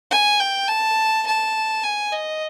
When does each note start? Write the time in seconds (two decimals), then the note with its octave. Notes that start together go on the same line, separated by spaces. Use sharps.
0.11 G#5
0.40 G5
0.68 A5
1.26 A5
1.84 G#5
2.13 D#5